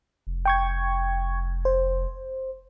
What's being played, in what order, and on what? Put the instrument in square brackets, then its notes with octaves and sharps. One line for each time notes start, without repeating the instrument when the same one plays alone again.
[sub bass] F1
[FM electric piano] G5 C#6 G#6
C5